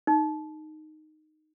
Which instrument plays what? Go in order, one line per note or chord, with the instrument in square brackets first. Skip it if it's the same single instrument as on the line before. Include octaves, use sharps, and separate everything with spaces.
[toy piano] D#4